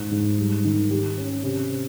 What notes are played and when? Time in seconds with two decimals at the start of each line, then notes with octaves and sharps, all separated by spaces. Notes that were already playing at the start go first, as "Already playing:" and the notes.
Already playing: G#2
0.11 G#2
0.38 G3
0.64 D#3
0.91 G4
1.17 C#4
1.43 C3